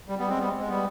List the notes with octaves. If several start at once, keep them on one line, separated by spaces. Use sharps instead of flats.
G3
G3 B3
G#3 C4
G3 B3
G#3
G3 B3